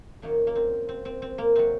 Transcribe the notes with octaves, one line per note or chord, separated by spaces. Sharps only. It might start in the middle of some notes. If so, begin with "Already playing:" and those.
F#2 D#3 F#3 A#3
A#3
C4
C4
C4
C4
A#3
C3 F#3 C4